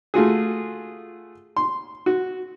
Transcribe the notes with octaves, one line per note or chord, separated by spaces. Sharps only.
A3 F4 F#4 G#4
C6
F#4